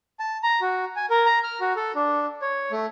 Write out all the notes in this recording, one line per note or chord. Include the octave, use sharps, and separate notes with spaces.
A5
A#5
F#4
G#5
A#4
A#5
F6
F#4
A4
D4
C#5
A3